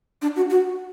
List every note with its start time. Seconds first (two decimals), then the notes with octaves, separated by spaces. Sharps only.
0.22 D4
0.36 F#4
0.50 F#4